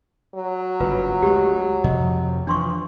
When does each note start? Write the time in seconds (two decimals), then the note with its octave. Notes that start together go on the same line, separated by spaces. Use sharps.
0.35 F#3
0.80 F#1 G2 F4 B4
1.22 D2 G#3 G4
1.84 F2 C3 F3 D#5
2.47 E3 F3 D4 C6 C#6